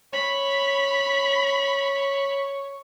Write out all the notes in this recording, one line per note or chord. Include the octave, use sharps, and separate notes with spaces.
C#5 B5